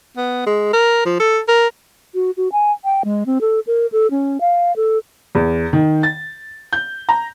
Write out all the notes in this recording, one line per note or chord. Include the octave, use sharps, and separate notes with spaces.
B3
G#3
A#4
F3
A4
A#4
F#4
F#4
G#5
G5
G#3
C4
A4
A#4
A4
C#4
F5
A4
E2
D#3
A6
G6
A#5